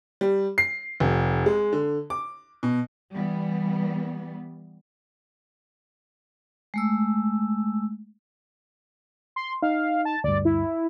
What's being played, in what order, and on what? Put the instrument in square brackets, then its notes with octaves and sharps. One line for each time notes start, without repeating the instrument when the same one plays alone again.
[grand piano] G3
C7
F1
G#3
D3
D6
B2
[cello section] E3 G3 B3
[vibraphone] G#3 A3 E6
[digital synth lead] C6
[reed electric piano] D#4 [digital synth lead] F5
[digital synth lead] A5
[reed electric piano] D2 G2 [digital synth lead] D5
[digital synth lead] E4